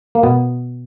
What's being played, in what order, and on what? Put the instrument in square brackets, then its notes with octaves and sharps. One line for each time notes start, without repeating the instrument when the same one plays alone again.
[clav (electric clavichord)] A#3
B2 B3